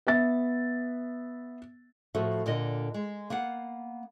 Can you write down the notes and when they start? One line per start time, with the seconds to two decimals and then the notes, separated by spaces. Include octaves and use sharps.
0.07 B3 E5 A6
2.15 A2 F3 F#4 A4 E5
2.46 A#2 D3 A#4 D#5
2.94 G#3
3.30 A#3 B3 F5 F#5